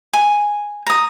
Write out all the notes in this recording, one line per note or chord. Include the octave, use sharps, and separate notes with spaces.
G#5
A#5 D#6